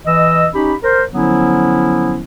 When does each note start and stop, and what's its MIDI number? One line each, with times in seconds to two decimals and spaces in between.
0.06 0.47 52
0.06 0.47 75
0.06 0.47 88
0.54 0.74 61
0.54 0.74 63
0.54 0.74 67
0.54 0.74 83
0.83 1.03 70
0.83 1.03 72
1.13 2.22 50
1.13 2.22 53
1.13 2.22 54
1.13 2.22 59
1.13 2.22 61
1.13 2.22 64